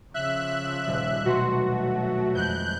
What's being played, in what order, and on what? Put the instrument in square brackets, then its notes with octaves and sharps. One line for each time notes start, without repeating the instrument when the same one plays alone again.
[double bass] C#3 F3 [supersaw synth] E5 F#6
[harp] D#1 G3
[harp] B2 C6 [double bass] F#3 A3 [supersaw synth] F#4
[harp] F2 G#3 [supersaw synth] F#6 G6